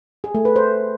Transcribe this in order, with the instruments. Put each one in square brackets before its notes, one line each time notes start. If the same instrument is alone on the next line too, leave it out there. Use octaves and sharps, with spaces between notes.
[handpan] G#4
A3
B4
C5